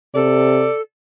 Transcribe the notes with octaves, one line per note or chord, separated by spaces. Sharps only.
C3 A4 D5